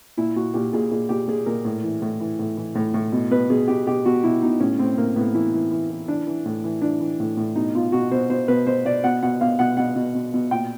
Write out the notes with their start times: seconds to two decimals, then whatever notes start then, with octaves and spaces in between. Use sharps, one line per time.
0.17 A#2 E4
0.36 A#2 F#4
0.54 A#2 G4
0.73 A#2 G#4
0.91 A#2 G#4
1.09 A#2 G4
1.28 A#2 G#4
1.46 A#2 A#4
1.65 A2
1.83 E3
2.02 A2
2.20 E3
2.39 A2
2.57 E3
2.75 A2
2.94 A2
3.12 B2
3.31 B2 B4
3.50 B2 G#4
3.68 B2 G4
3.86 B2 G4
4.05 B2 F#4
4.23 B2 E4
4.42 B2 D#4
4.60 A2 C#4
4.79 A2 C4
4.98 A2 A#3
5.16 A2 B3
5.34 E3 E4
5.53 E3
5.71 E3
5.90 E3
6.08 E3 D4
6.27 E3
6.45 A2
6.64 E3
6.82 E3 D4
7.00 E3
7.20 A2
7.37 A2
7.56 B2 D#4
7.74 B2 F4
7.92 B2 F#4
8.11 B2 C5
8.30 B2 C5
8.48 B2 B4
8.67 B2 C5
8.85 B2 D5
9.04 B2 F#5
9.22 B2 F#5
9.41 B2 F5
9.59 B2 F#5
9.77 B2 F#5
9.96 B2
10.15 B2
10.34 B2
10.51 A#2 G5